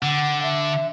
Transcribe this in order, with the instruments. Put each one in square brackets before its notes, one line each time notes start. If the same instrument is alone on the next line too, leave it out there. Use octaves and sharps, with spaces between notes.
[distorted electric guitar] D3 [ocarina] F#5
[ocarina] E5